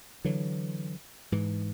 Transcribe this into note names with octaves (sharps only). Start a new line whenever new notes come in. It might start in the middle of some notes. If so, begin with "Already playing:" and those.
D3 E3 F#3
G#2 E3